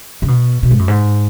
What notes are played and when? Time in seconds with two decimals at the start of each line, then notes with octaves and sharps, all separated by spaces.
0.22 C#3
0.28 B2
0.63 B2
0.71 G#2
0.79 F#2
0.88 G#2